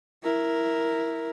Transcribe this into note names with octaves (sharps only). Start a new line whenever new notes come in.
E4 A#4